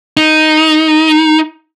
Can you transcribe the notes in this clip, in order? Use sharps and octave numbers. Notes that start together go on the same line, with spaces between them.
D#4